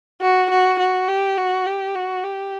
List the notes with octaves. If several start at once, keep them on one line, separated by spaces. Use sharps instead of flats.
F#4
F#4
F#4
G4
F#4
G4
F#4
G4